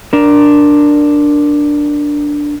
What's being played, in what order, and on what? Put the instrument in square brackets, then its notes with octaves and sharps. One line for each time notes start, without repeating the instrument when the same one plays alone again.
[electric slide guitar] D4 A#4